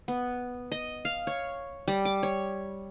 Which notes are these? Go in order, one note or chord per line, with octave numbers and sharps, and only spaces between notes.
B3
D#5
F5
C#5
G3
D6
C#5